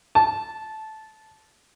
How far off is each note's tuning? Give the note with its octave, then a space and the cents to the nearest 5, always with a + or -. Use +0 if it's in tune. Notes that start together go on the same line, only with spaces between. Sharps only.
A5 -15